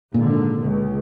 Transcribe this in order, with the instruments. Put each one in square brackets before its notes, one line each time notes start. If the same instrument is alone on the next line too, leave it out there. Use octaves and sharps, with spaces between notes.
[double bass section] G#1 D3 [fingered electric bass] A#2
[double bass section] C#2